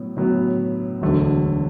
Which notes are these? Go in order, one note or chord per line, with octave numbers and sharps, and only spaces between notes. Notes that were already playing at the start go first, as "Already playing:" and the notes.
Already playing: A2 F#3 B3
A2 F#3 B3
E1 D2 D3 F#3 A3